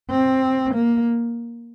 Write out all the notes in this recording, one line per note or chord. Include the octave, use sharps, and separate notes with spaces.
C4
A#3